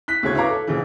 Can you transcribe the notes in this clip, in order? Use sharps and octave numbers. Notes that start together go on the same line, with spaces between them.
F#6 B6
D2 C#3 C#5 G#6
E4 B4 C#5 F5 A#5 D6
A4
A#1 C#3 E3